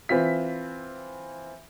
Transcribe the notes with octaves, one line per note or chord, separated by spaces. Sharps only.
E3 C4 F4 B6